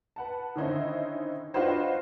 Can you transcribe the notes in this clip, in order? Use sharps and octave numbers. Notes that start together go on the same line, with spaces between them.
B4 F#5 A5
D3 D#3 C#4 D#4 E4 C5
D4 F4 F#4 B4 C5 D#5